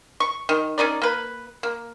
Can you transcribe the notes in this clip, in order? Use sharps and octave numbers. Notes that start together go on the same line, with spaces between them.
C#6
D#3
C#4 D#4 A#4 D5
A#3 B4
A#3